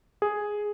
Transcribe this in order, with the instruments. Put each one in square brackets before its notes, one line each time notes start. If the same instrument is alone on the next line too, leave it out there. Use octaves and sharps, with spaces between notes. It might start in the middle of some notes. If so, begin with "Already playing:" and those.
[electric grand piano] G#4